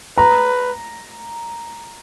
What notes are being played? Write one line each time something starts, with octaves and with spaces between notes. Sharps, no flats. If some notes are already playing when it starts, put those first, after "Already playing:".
B4 A#5